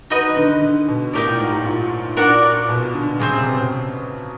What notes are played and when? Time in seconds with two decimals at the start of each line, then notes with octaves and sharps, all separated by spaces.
0.10 D#3 D#4 F#4 B4 D#5
0.23 D#3
0.36 D3
0.49 D#3
0.62 D3
0.88 B2
1.13 A2 D#4 G4 A#4 D5
1.27 A#2
1.39 G#2
1.53 A2
1.66 A#2
2.17 A#2 D4 F#4 A#4 D5
2.69 B2
2.94 D3
3.20 C#3 C4 D#4 G#4
3.33 C3
3.46 B2
3.59 C3